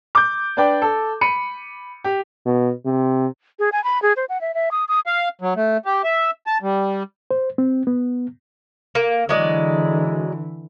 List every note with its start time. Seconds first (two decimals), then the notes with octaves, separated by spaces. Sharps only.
0.15 D6 G6
0.57 D4 B4 D5 G5
0.82 A4
1.21 B5 C#7 D#7
2.04 G4
2.46 B2
2.85 C3
3.59 G#4
3.72 G#5
3.84 B5
4.02 G#4
4.17 C5
4.29 F#5
4.41 E5
4.54 E5
4.71 D#6
4.88 D#6
5.06 F5
5.41 F#3
5.56 A3
5.85 G4
6.04 E5
6.47 A5
6.62 G3
7.31 C5
7.58 C4
7.87 B3
8.95 A#3
9.29 D3 E3 F#3 G#3 D5